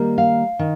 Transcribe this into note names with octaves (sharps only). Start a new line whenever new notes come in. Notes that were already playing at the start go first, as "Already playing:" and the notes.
Already playing: D#3 G3 A#3
F5
D#3